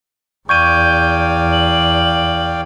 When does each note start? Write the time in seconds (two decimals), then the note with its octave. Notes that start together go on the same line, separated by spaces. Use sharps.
0.49 E2 D5 F5 G5 C#6 G6 G#6 D#7
1.52 F#7